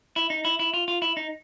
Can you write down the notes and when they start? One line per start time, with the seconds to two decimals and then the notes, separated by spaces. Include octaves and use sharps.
0.16 E4
0.30 D#4
0.45 E4
0.59 E4
0.74 F4
0.88 F4
1.02 E4
1.17 D#4